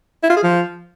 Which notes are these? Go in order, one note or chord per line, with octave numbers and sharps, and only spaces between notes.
E4
F4
G#4
F3